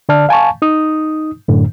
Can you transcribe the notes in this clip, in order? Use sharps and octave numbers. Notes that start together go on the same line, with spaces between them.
D3 D5 A5 F6
F5 G#5 A5 C#6
D#4 D#6
F#2 A2 D3